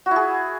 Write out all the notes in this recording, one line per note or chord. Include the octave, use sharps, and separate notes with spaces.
F#4
E4
G#4